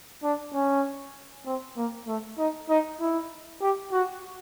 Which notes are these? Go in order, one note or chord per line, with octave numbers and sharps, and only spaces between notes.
D4
C#4
C4
A#3
A3
D#4
D#4
E4
G4
F#4